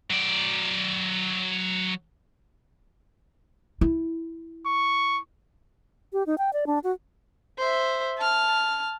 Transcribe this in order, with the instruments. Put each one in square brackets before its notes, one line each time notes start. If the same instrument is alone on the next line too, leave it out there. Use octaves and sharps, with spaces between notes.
[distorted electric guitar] F#3 D5
[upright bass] E4
[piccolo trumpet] C#6
[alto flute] G4
D#4
G5
D5
D4
F#4
[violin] C5 E5
A5 F6